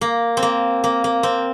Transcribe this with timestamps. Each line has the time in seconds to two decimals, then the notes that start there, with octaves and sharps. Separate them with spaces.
0.01 A#3
0.37 C4
0.43 A#3
0.84 A#3
1.04 A#3
1.23 C4